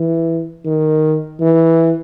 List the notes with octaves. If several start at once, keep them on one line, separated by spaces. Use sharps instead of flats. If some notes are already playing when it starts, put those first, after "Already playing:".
Already playing: E3
D#3
E3